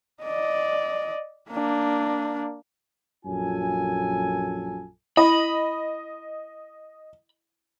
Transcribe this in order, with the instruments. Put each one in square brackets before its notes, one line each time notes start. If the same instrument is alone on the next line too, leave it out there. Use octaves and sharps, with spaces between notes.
[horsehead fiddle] D5 D#5
A#3 D4
[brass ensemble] A#1 F#2 F4 A4 G#5
[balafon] E4 [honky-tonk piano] D#5 [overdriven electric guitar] B5